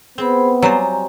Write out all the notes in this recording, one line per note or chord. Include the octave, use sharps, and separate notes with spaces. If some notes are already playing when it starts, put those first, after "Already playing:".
B3 C4 G#4 C5 B5
F#3 G3 F4 C5 G#5 A#5